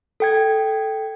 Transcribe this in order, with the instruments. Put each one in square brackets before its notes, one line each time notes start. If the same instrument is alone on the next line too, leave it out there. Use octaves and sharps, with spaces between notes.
[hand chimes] A4 G5 G#6